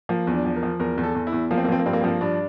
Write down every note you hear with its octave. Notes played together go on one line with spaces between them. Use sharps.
F3 A#3
E2
D4
F3
A#4
F3
E2 A#4
E2
A4
E2
E4
E2
F3 A#3
C4
A#3
F3 C4
A#3
G2 C4
A#3
C4
F3 A#3
G2 D4